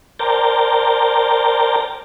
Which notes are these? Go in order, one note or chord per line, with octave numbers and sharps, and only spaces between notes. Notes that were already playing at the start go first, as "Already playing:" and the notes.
A#4 C5 D5 G5 A5 A#5